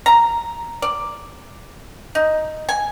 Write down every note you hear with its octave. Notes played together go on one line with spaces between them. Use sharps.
A#5
D5
D#4
G#5